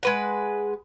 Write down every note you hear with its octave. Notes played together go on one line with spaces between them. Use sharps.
G#3 B4 F#5